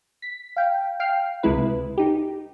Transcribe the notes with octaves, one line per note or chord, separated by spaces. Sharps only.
B6
F5 G5
F5 G5 F6 C7
C#2 C3 G#3 E4 B4
D#4 G4